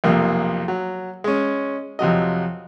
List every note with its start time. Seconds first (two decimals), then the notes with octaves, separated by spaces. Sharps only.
0.04 B1 F2 C3 A#3
0.68 F#3
1.24 G#3 C#4
1.99 F2 C3 F#3 D#5